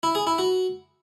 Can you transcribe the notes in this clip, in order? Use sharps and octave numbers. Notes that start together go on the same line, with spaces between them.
E4
G#4
E4
F#4